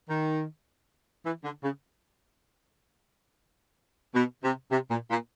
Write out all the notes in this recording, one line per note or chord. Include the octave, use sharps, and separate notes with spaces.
D#3
E3
D3
C#3
B2
C3
C3
A#2
A#2